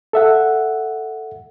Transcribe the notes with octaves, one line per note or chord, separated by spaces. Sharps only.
A4 E5 F#5